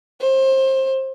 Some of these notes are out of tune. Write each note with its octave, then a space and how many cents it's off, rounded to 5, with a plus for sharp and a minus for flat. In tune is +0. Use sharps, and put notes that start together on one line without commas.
C5 +25